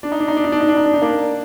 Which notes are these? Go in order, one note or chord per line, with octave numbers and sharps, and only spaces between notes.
D4
D#4
D4
D#4
D4
D#4
D4
D#4
D4
D#4
D4
D#4
A#3 D4